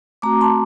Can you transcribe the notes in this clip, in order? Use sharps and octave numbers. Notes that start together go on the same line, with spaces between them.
A3 C4 F#4 A#5 D6
A5 C6